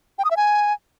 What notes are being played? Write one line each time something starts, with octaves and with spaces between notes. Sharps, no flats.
G5
D#6
E5
G#5